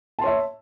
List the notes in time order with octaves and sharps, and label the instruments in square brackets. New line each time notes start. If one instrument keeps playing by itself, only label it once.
[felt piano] A5
C6
C#5
E5